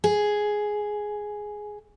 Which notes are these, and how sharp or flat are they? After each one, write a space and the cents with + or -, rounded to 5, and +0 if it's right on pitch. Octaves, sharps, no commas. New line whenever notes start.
G#4 +5